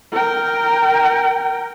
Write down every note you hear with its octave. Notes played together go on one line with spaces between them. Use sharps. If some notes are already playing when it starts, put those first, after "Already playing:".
A#4 G5